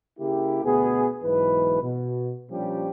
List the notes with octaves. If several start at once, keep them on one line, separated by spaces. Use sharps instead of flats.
C#3 A#3 E4 G4
D2 B2 B3 G#4
B1 G#2 E3 B4
B2
A#2 F3 G3 C#4 D4 G4